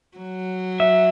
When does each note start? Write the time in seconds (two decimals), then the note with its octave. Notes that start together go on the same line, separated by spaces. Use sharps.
0.17 F#3
0.80 E5